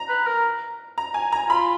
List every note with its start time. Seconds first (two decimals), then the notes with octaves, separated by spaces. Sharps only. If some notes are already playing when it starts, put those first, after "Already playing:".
Already playing: A#5
0.09 B4
0.27 A#4
0.98 A#5
1.14 G#5
1.32 A#5
1.49 F4 B5